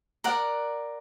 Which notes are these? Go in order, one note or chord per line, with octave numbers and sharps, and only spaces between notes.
A#4 D5 F#5